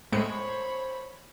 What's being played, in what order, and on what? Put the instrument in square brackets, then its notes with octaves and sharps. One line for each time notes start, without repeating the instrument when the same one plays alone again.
[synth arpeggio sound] A2 G#3 C#7 [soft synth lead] C5 [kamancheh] C#5 B5